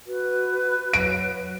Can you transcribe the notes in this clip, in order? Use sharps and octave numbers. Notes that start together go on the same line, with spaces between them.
F#4 B4
F#3 D7